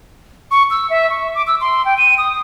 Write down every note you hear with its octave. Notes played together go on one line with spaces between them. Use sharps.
C#6
E6
E5
C#6
D6
E6
C6
G5
D#7
D#6